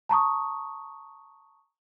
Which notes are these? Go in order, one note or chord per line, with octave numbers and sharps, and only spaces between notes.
A5 A#5 C#6 D#6